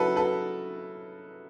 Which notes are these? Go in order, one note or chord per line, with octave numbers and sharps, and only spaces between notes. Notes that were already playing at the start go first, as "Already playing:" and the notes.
Already playing: C#3 F#3 E4 F#4 A4 B4
A4 B4